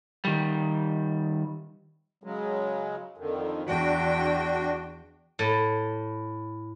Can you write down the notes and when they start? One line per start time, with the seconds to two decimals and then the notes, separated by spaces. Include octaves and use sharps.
0.25 D#3 G3
2.24 C#3 F#3 G#3
3.17 F2 D3 D#3
3.67 E2 D4 F#4 G5
5.39 A2